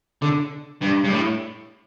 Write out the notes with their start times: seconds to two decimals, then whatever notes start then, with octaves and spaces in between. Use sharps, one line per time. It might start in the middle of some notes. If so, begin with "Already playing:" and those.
0.22 D3
0.82 G2
1.04 G2
1.12 A2